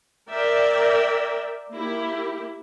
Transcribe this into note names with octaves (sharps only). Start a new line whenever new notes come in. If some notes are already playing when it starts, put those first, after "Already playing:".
A#4 D5 E5 G5
A#3 E4 G4